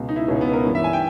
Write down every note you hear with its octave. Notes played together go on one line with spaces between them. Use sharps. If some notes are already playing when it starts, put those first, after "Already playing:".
Already playing: C#2 B2
D#4
E4
C#2 B2 C#4
B3
A#4
G2 E3
E5
G#5
G5